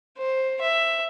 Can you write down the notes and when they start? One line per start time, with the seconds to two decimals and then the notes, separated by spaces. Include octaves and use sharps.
0.18 C5
0.61 E5